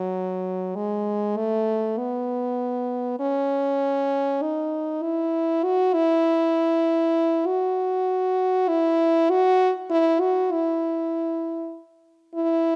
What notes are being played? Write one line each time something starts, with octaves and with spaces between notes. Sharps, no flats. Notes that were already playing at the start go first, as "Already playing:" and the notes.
Already playing: F#3
G#3
A3
B3
C#4
D#4
E4
F#4
E4
F#4
E4
F#4
E4
F#4
E4
E4